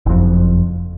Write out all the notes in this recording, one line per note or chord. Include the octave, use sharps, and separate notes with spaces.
F#1 F2